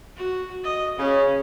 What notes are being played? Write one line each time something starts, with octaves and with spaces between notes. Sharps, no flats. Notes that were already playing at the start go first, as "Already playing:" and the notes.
F#4
D#5
C#3 C#4